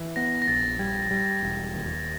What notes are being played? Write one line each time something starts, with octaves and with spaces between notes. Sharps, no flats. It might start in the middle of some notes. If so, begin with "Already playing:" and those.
Already playing: E3
B3 A#6
A#6
A#1 A6
G3 G#6
G3
E1
D#2